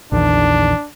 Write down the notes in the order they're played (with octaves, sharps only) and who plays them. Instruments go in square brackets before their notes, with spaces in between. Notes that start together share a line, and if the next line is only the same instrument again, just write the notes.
[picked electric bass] A#1 E2 D#3 [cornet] D4